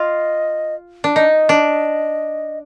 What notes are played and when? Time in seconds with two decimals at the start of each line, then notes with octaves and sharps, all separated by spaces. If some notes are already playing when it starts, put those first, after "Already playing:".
Already playing: F4 D#5
1.04 D4
1.16 D#4 D#5
1.49 D4